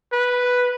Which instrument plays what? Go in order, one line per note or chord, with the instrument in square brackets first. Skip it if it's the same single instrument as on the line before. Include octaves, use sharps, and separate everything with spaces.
[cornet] B4